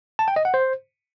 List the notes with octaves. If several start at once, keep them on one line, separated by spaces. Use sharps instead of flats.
A5
G5
D#5
F#5
C5